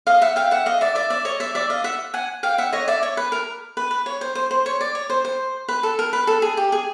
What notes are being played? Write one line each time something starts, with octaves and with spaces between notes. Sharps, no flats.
D#5 F5
E5 F#5
F5 G5
E5 F#5
D#5 F5
D5 E5
D5 E5
D5 E5
C#5 D#5
D5 E5
D5 E5
D#5 F5
E5 F#5
F#5 G#5
F5 G5
E5 F#5
C#5 D#5
D5 E5
C#5
B4
A#4
B4
B4
C#5
C5
C5
C5
C#5
D5
C#5
C5
C5
B4
A4
A#4
B4
A4
G#4
G4
G#4